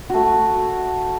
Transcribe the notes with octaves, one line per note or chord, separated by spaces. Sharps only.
A3 F#4